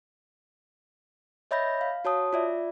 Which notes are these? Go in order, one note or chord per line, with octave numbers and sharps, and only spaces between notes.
C#5 D#5 E5 B5 G6 A#6
F5
F#4 C#5 A5 D#6
F4 D5 E5